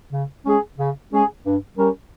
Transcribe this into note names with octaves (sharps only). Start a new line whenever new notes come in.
C#3
G#3 C#4 G#4
C#3
G#3 C#4 G#4
G2
G3 C#4 G4 A#4